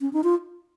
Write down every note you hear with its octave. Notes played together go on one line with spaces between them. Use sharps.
C#4
D#4
F4